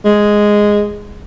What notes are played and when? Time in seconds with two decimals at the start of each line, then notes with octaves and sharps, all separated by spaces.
0.05 G#3